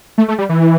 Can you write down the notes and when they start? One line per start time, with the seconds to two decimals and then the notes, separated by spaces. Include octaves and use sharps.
0.18 A3
0.28 A3
0.38 G3
0.49 E3